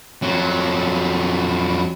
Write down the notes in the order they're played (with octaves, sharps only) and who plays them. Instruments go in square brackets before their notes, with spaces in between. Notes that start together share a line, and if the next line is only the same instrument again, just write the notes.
[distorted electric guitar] F2 F#3